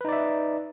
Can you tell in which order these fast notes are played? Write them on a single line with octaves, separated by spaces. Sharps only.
B4 D#4 D5 E5